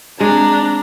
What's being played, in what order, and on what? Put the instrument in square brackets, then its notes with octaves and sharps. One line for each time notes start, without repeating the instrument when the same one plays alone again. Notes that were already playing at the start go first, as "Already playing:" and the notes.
[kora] G#3 [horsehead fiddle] C4 A#5 [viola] D4